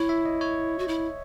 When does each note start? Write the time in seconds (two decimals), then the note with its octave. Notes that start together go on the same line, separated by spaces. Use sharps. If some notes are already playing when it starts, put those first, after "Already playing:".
Already playing: E4 C#5
0.09 E5
0.26 D#5
0.41 C#5
0.79 F#4
0.88 E4